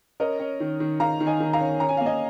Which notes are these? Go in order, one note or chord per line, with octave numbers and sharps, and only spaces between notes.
C#4 A#4 D#5
C#4
D#3
D#3
D#3 F5 A#5
D#3
D#5 G#5
D#3
F5 A#5
C#4
C#4 A#5
G#5
A#3 F5
D#5 G#5